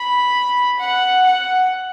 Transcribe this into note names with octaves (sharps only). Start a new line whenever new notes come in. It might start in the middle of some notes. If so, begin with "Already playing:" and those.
Already playing: B5
F#5
F#5